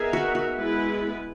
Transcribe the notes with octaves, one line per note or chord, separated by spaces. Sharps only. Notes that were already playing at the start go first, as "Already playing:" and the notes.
Already playing: B3 D#4 G#4 A#4 E5
F#4
F#4
G#3 B3 E4 B4